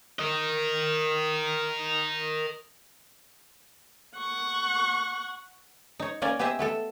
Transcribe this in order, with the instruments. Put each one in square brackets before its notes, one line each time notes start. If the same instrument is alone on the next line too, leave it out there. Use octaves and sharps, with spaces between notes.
[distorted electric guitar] A#4 D#5
[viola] F#5 C#6
[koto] D#4 C#5
A#3 C#4 D5 G#5 A#5
B3 G4 G#4 C5 D#5 E5
A3 B3 A4